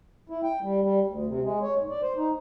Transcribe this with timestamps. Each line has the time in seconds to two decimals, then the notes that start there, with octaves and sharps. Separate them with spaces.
0.30 E4
0.43 G5
0.62 G3
0.82 G3
1.07 D2
1.27 C3
1.43 G#3
1.62 C#5
1.78 G#2
1.90 D5
2.03 C5
2.17 D#4